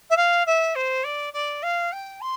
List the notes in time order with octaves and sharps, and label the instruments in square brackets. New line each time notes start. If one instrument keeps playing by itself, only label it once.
[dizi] E5
F5
E5
C5
D5
D5
F5
G5
C6